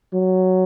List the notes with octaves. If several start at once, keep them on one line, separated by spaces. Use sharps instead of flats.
F#3